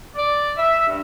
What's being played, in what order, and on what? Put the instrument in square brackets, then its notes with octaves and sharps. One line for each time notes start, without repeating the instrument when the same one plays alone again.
[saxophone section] D5
E5
G2